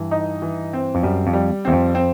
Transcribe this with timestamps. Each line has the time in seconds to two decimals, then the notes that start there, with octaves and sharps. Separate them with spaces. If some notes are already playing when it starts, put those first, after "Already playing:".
Already playing: G2 E3
0.11 D#4
0.42 E3
0.73 C4
0.95 F2
1.03 F#2 G3
1.27 F2
1.33 G3
1.65 E2 C4
1.73 F2
1.95 C4